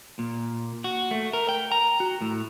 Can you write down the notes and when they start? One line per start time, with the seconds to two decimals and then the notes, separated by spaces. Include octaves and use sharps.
0.19 A#2
0.84 F#4
1.11 A3
1.33 A#4
1.49 G5
1.72 A#5
2.00 F#4
2.22 A2